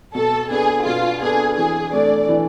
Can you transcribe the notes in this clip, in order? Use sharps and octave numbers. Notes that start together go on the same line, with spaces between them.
B2 A4
B3 D4 G#4 A4
B2 F4
B3 D4 G#4 A4
E3 G#4
A3 D4 A4 D5
E3